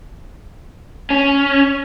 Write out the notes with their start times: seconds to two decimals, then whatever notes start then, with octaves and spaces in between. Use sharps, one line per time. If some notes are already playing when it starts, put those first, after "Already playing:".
1.10 C#4